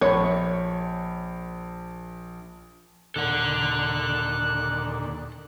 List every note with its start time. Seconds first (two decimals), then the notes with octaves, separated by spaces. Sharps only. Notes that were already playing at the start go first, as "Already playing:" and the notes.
0.01 A#1 C#5 B5
3.16 D#2 A#2 D3 A4 F#5 F#6